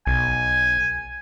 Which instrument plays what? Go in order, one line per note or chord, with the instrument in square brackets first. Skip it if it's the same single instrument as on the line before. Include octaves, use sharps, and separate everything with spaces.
[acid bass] B1 [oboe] G#5